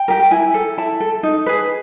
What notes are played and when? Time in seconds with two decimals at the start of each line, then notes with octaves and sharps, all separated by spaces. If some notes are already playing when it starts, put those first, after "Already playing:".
Already playing: G5
0.08 G4 A#4
0.31 E4 G#5
0.54 A4
0.78 E4 A5
1.00 A4
1.23 D#4
1.46 G#4 B4